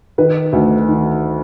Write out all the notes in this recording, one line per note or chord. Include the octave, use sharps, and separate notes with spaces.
D#3 B4
D2
D#3